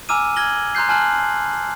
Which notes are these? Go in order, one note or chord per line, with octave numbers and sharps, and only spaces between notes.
G#5 A#5 D6 E6 F6 D#7
F6 G#6 A#6 F#7 G7
A#5 C6 F#6 G6 C7
G#5 A5 F6 F#6 F#7